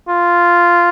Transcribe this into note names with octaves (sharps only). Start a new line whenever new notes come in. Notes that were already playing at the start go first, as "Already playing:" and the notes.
F4